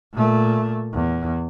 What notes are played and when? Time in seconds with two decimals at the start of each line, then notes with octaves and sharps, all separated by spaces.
0.14 A#2 A3
0.94 E2